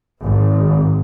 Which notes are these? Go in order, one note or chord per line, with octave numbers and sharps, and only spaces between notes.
G#1